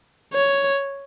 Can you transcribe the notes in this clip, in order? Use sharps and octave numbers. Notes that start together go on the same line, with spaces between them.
C#5